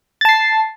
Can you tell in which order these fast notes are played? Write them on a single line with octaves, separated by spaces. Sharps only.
A6 A5 C7